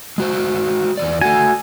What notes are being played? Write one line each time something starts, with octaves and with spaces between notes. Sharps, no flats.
G#3 F#4 C5
E2 D#3 D5
A3 F#4 G#5